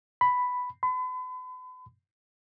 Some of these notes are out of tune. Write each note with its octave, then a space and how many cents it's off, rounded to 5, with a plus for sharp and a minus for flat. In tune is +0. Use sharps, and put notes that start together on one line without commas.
B5 +5
B5 +40